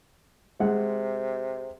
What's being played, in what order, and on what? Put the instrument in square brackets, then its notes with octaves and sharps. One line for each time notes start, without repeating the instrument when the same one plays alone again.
[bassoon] C3 [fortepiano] G#3 F#5